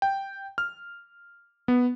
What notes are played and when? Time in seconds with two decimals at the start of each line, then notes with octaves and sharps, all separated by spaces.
0.02 G5
0.58 F6
1.68 B3